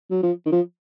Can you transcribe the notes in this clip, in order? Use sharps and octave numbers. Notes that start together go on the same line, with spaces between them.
F#3
F3
D#3
F3